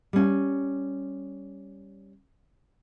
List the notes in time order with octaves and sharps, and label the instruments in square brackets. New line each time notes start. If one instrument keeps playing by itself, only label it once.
[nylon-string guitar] G3 C#4